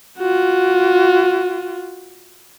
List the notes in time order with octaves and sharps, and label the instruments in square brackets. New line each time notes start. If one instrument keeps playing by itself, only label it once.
[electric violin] F4 F#4